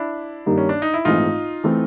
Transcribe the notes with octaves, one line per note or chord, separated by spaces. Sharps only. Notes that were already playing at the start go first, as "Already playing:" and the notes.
Already playing: D4 E4
G2 D#3 G3 A#3 D#4
C#4
D4
D#4
E4
A#1 G#2 E3 A3 C4 D#4 F4
E3 A3 C4